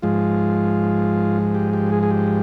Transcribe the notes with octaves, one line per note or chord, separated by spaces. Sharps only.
G#2 F3 G#3 F4
G4
G4
G#4
G#4
G4